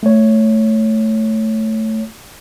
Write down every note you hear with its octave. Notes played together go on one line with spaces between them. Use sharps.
A3 C#5